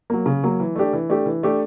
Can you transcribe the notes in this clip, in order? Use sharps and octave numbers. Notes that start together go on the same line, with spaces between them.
F#3 A#3
C#3
F#3 A#3
E3
A3 D4 G4
E3
A3 D4 G4
E3
A3 D4 G4